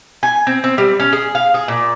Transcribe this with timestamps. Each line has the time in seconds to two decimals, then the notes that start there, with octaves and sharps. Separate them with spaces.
0.23 G#5
0.47 C4
0.64 C4
0.78 G3
1.00 C#4
1.13 G#4
1.35 F5
1.54 G#4
1.68 A#2